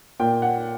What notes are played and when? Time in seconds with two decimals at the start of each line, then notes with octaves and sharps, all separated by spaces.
0.20 A#2 G5
0.42 F#5